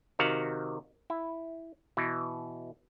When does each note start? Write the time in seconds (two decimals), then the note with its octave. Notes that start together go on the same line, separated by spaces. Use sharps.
0.19 C3 D#3 F#4 F5 F#5
1.10 E4
1.97 B2 E3